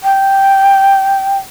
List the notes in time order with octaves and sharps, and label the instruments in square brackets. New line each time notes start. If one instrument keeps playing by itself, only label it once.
[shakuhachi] G5